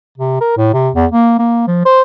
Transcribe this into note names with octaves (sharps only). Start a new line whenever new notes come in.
C3
A#4
A2
C3
E2
A#3
A#3
F3
C5